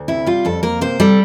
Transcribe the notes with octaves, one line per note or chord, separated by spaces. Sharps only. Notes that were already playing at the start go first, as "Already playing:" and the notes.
Already playing: D2
C3 E4
G3 F4
F2 A4
A#3 A#4
C3 C5
G3 A4